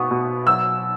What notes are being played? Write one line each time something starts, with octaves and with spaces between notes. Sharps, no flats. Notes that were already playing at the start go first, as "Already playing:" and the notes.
Already playing: B2 B3 C#6 D#6
B2
F#3 E6